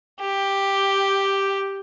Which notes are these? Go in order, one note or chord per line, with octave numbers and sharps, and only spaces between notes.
G4